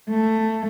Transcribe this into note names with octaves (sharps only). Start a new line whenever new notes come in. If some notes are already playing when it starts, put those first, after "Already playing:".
A3